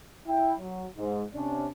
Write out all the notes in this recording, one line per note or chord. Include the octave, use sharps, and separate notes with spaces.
E4 G5
F#3
G#2
C3 C#4 D4